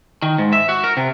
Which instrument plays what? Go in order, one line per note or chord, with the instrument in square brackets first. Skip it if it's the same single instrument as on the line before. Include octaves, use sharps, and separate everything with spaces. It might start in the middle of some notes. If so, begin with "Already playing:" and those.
[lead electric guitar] D#3
G#2
E5
F#4
A#4
C3